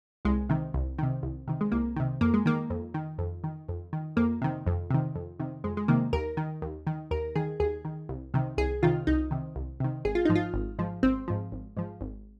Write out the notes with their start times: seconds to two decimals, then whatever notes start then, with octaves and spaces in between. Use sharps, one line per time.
0.25 C2 G#3
0.49 C3 D#3
0.74 C2
0.98 C3 D#3
1.23 C2
1.48 C3 D#3
1.61 G#3
1.72 C2 A#3
1.96 C3 D#3
2.21 F2 A#3
2.34 G#3
2.46 D#3 A#3
2.70 F2
2.94 D#3
3.18 F2
3.44 D#3
3.69 F2
3.93 D#3
4.16 F2 A#3
4.42 C3 D#3
4.67 F2
4.90 C3 D#3
5.15 F2
5.40 C3 D#3
5.64 F2 G#3
5.77 G#3
5.88 C3 D#3 A#3
6.13 D#2 A#4
6.37 D#3
6.62 D#2
6.87 D#3
7.11 D#2 A#4
7.36 D#3 G#4
7.60 D#2 G#4
7.85 D#3
8.09 C2
8.34 C3 D#3
8.57 C2 G#4
8.83 C3 D#3 F4
9.07 C2 D#4
9.31 C3 D#3
9.56 C2
9.80 C3 D#3
10.05 G#1 G#4
10.15 F4
10.25 G#2 F3 D#4
10.35 F4
10.54 G#1
10.79 G#2 F3
11.03 G#1 C4
11.28 G#2 F3
11.52 G#1
11.77 G#2 F3
12.01 G#1